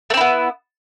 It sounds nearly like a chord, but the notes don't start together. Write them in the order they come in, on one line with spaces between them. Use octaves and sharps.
A3 C4 E4 B3